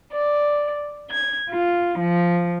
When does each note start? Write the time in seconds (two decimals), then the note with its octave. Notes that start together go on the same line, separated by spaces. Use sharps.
0.10 D5
1.09 G#6
1.51 F4
1.98 F3